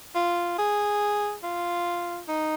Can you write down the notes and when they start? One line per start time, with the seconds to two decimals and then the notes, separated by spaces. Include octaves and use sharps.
0.15 F4
0.58 G#4
1.43 F4
2.28 D#4